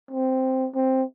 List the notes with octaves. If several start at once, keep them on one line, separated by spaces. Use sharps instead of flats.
C4
C4